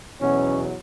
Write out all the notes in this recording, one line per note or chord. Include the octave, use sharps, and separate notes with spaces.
E2 B2 F#3 C#4